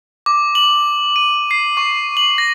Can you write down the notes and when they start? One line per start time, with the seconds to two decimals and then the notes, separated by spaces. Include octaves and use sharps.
0.26 D6
0.55 F#7
1.16 D#7
1.51 C7
1.77 C#6
2.17 F#7
2.38 A#6